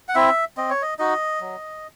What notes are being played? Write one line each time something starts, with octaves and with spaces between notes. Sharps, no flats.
F#5
C4 E4 E5
C4 D#5
C#5
D#5
D#4 F#4 D#5
F#3